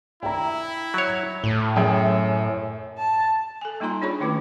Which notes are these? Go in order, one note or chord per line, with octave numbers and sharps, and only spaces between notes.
E4 G5 A#5
F#3 C#5
A2
F#2 G#4 G5
A5
A4 G#5
G3 A#3 D#4 F4 A#5 C6
D4 F4 G#4 C#5 B5 C#6
D#3 A3 C#4 E4 B4 D6